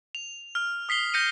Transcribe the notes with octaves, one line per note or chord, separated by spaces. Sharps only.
F7
F6
D#6 B6 C7 G7
G6 A#6 C#7 D#7